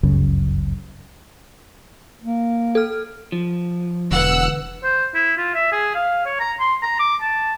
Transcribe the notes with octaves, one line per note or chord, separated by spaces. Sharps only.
G1 C#2 F#2 C#3
A#3
A4 F6
F3
E1 D3 B4 F#5 E6
C5
E4
F4
E5
G#4
F5
C#5
A#5
C6
A#5
D6
A5